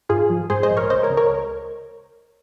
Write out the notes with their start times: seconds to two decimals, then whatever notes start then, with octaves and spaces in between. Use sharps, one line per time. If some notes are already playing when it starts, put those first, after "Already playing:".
0.09 G#2 F4 G#4
0.30 F3
0.50 G#2 G#4 C5
0.63 C5 D#5
0.70 A#1
0.77 A#4 C#5
0.90 C#2 C5 D#5
1.03 A#4 C#5
1.10 C#2
1.17 A#4 C#5